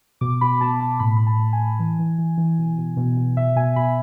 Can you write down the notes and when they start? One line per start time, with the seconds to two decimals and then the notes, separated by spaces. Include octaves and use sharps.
0.21 B2 D6
0.41 B2 B5
0.61 B2 A5
0.80 B2 A5
1.00 A2 B5
1.17 A2 B5
1.27 A5
1.39 A2
1.53 G#5
1.59 A2
1.79 E3
1.99 E3
2.18 E3
2.38 E3
2.58 B2
2.78 B2
2.97 B2
3.17 B2
3.36 B2 E5
3.56 B2 G#5
3.76 B2 B5